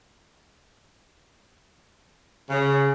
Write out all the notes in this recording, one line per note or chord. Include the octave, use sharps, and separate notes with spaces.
C#3